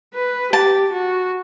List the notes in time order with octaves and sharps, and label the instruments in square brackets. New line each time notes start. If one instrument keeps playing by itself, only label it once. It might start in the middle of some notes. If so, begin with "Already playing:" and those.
[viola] B4
[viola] G4 [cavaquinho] A5
[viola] F#4